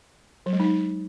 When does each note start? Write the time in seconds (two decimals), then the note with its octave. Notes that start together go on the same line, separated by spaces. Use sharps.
0.46 F#3
0.53 G#3
0.60 D#4